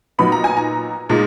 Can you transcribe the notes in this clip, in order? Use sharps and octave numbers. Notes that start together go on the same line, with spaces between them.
A#2 F#3 B3 D#4 B5
A#5
G#5
A#5
A#2 G#3 D#4